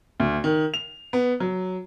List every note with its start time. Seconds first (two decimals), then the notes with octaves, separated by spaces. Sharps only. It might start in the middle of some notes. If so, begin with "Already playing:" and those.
0.20 D2
0.44 D#3
0.74 F7
1.13 B3
1.40 F#3